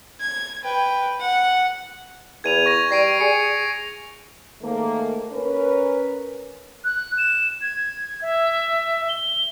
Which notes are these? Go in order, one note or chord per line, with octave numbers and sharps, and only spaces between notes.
G#6
B4 G5
F#5
E2 G#6 D#7 F7
C#6 A#6 F7
G3 A#6 C7 D7
G#4 C#7
G#2 D#3 A3 A#3
C#4 A#4 B4
F#6
E7
G#6
E5
G7